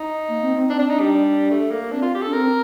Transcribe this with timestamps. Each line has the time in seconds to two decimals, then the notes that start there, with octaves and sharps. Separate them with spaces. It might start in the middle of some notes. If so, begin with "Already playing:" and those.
Already playing: D#4
0.28 A#3
0.42 C4
0.55 C4
0.69 C4 D4
0.79 D4
0.90 D4 D#4
1.00 G3
1.50 A3
1.71 A#3
1.91 C4 D4
2.02 F4
2.14 G4
2.22 D4 A4
2.32 C4 A#4